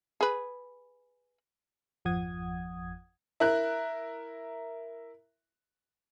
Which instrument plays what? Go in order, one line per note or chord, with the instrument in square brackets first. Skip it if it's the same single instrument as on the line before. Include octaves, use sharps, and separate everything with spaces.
[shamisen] G#4 B4
[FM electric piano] G#1 F2 F3 F#5 D#6 G#6
[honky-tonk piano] E4 A#4 F#6